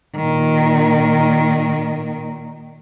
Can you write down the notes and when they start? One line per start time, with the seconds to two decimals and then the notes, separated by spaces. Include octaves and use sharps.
0.16 A#2 D#3